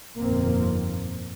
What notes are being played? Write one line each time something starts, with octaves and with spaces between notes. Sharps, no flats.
G1 F2 A#2 D#3 A#3 C4